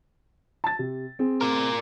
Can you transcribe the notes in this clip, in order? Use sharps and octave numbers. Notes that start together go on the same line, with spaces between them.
A5 A6
C3
C4 G#4
A#4 D5